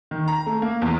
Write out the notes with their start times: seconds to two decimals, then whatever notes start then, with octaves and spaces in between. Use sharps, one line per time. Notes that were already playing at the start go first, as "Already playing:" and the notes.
0.11 D#3
0.28 A#5
0.46 A3
0.62 A#3
0.82 E2